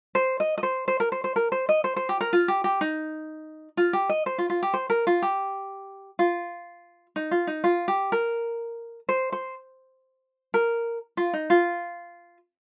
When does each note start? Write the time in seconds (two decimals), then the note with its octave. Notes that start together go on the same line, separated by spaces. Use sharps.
0.15 C5
0.40 D#5
0.58 D#5
0.63 C5
0.88 C5
1.00 A#4
1.12 C5
1.24 C5
1.36 A#4
1.52 C5
1.69 D#5
1.84 C5
1.96 C5
2.09 G4
2.21 A#4
2.33 F4
2.48 G4
2.64 G4
2.81 D#4
3.77 F4
3.93 G4
4.09 D#5
4.26 C5
4.38 F4
4.50 F4
4.63 G4
4.74 C5
4.90 A#4
5.07 F4
5.22 G4
6.19 F4
7.16 D#4
7.31 F4
7.47 D#4
7.64 F4
7.88 G4
8.12 A#4
9.09 C5
9.32 C5
10.54 A#4
11.17 F4
11.33 D#4
11.50 F4